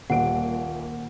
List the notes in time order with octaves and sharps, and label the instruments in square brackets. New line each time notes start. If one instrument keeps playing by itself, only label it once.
[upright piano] D#1 G3 D7 [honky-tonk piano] A#2 [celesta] F#5